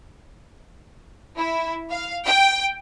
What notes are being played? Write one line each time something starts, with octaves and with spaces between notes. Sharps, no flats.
E4
F5
G5